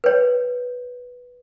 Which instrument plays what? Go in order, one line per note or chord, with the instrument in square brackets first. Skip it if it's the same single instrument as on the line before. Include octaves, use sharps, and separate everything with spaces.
[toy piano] B4 C#5